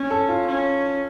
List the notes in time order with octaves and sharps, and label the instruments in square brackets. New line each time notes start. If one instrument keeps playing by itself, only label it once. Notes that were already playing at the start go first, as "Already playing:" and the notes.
Already playing: [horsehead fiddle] C#4
[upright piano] A4
F4
[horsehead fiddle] C#4